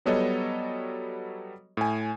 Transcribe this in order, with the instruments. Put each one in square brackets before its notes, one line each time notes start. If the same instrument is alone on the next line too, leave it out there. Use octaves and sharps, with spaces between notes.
[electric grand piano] F#3 G3 B3 A4 C#5 D#5
A2 G#5